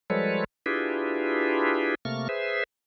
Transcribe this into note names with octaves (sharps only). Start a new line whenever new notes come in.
F3 G3 G#3 A4 B4 C#5
D4 E4 F4 G4 G#4 B4
C3 A3 A#3 C#6 F6
G#4 B4 C5 E5